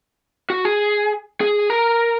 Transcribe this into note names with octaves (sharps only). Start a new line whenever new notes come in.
F#4
G#4
G#4
A#4